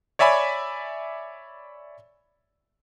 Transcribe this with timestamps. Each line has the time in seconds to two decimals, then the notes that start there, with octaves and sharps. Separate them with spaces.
0.19 C#5 D5 E5 G#5 B5 D6